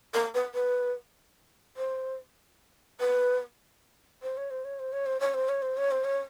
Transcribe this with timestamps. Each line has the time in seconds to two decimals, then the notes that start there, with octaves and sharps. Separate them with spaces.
0.14 A#4
0.34 B4
0.54 B4
1.77 C5
3.00 B4
4.23 C5
4.37 C#5
4.50 C5
4.65 C#5
4.79 C5
4.93 C#5
5.06 C5
5.20 C#5
5.34 C5
5.49 C#5
5.62 C5
5.77 C#5
5.91 C5
6.04 C#5